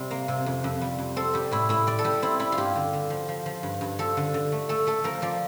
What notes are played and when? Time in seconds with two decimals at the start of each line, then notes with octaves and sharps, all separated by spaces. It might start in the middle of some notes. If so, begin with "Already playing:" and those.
Already playing: C3 G3
0.11 A#3
0.28 C3
0.46 F2
0.64 F2
0.81 G3
0.99 F2
1.16 C4 A4
1.34 G3 G4
1.51 A2 E4
1.69 A2 E4
1.87 G3 D5
1.99 A4
2.04 G3 G4
2.22 C4 E4
2.39 G3 E4
2.52 F4
2.58 G2 G4
2.75 D3
2.93 D3
3.10 F3
3.29 F3
3.46 F3
3.63 G2
3.81 G2
3.98 F3 A4
4.17 D3
4.34 D3
4.52 A3
4.69 A3 A4
4.87 A3 A4
5.04 F3 A#4
5.22 F3 D5